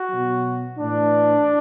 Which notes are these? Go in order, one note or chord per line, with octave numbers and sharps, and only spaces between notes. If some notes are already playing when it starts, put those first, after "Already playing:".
Already playing: F#4
B2 F#3
A2 E3 D4